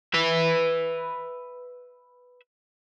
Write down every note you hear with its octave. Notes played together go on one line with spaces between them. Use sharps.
B4 E5